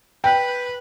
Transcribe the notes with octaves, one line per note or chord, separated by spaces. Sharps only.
B4 G5